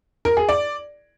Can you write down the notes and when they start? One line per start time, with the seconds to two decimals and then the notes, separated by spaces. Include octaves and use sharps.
0.25 A#4
0.37 G#4
0.49 D5